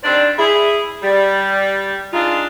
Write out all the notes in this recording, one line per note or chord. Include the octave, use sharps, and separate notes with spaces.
D#3 G3 C4 D4 C5 D5
E4 G#4
G3
G#3 D4 D#4 F4